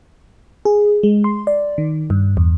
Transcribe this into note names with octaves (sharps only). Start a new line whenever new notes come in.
G#4
G#3
C6
D5
D#3
G2
E2